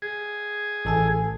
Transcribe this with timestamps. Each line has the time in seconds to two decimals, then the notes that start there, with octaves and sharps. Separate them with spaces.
0.02 G#4
0.85 A1 A4 G#5